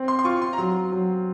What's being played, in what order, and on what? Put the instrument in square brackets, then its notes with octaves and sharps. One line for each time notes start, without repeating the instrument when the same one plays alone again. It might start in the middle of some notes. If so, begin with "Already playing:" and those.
Already playing: [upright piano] C4
[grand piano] C6
C6
[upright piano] F4 [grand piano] C#6
[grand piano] C6
A#5
[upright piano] F#3 [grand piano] C6
[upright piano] F#3